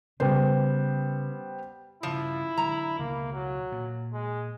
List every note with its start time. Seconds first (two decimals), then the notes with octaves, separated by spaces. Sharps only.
0.20 C#3 G3 B3 C5
2.03 G2 C#3 F3 E4
2.57 D3 F#3 G#3 A#5
2.99 C#2 B2 A#3
3.33 F#3
3.72 A#2
4.13 G#3